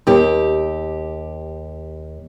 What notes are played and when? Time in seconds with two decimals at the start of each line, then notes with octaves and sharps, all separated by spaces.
0.07 D#2 G4